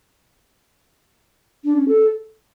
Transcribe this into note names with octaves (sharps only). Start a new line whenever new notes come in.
D4
C#4
A4